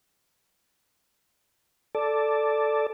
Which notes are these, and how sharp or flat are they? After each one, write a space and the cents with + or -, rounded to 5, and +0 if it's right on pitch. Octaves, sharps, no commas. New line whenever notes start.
A4 +0 D5 +0